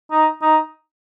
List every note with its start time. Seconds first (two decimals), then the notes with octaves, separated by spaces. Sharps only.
0.11 D#4
0.42 D#4